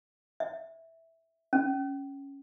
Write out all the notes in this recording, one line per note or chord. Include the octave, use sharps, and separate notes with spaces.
E5
C#4